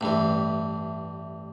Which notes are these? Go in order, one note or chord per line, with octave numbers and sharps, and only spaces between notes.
A1 G2 E3